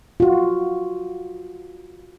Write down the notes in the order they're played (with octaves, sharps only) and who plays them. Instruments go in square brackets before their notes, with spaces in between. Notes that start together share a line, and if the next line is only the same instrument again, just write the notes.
[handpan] F4 F#4